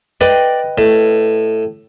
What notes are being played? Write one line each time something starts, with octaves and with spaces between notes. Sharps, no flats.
B4 D5 D#5 G5
A2